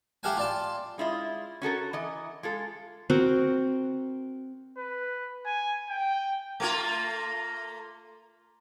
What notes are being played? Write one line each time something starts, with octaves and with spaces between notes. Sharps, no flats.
E4 G4 A4 F5 F#5 G#5
F4 D5 A5
G#3 E4 F4 D#5
C#4 F#4 A4 A#4
E3 D#5
G#3 F4 A4
C4 F#4 A#4
B4
G#5
G5
A3 A#3 F4